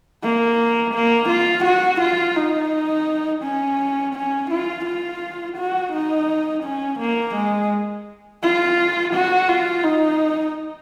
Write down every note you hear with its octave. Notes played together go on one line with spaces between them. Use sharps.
A#3
A#3
F4
F#4
F4
D#4
C#4
C#4
F4
F4
F#4
D#4
C#4
A#3
G#3
F4
F#4
F4
D#4